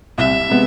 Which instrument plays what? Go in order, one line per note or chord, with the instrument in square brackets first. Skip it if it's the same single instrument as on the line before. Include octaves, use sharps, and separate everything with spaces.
[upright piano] C2 [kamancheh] E5
[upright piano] C3 G#3 B3